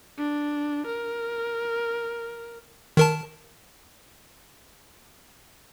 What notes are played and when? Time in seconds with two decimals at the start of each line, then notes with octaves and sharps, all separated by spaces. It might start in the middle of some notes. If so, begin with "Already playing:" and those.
0.17 D4
0.86 A#4
2.97 D#3 A#4 A5